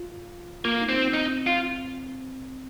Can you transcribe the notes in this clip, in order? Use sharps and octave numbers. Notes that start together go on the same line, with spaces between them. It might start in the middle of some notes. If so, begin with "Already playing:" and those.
Already playing: F4
A#3 F4
D#4
C4
C#4
C4 D#4
F4